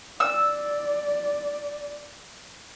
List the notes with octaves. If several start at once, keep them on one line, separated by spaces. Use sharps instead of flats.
D5 E6